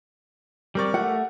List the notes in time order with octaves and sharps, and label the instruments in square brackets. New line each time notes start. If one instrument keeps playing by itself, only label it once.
[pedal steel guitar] G3 C4 D5 [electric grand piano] G4 A#4 C#6
[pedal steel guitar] A3 [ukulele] F#5